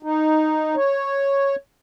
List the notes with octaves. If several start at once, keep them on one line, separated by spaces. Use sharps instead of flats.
D#4
C#5